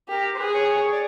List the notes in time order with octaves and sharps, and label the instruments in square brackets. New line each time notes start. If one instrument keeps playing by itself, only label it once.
[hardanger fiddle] G4 [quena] A#4
[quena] C5
[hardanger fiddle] G#4 [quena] B4
[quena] C#5
C#5
D5